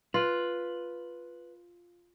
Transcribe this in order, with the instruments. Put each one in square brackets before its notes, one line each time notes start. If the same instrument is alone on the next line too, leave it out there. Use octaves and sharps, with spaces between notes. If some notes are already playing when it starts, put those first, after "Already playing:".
[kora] F4 [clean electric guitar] B4